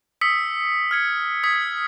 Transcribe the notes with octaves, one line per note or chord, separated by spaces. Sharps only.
D#6 E6 B6 C#7
F6 G#6 C#7
D#6 G#6 B6